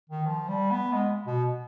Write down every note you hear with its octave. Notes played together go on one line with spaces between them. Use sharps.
D#3
F3
G3
B3
G#3
B2